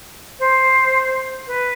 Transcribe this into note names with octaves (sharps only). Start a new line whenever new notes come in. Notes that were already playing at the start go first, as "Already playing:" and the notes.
C5
B4